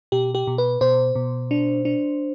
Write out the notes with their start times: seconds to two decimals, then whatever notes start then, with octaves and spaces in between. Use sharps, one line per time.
0.12 B2 G4
0.35 G4
0.47 B2
0.58 B4
0.81 B2 C5
1.15 B2
1.51 D4
1.85 D4